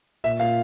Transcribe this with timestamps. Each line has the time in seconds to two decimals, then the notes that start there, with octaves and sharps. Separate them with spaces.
0.24 A#2 E5
0.40 A#2 F5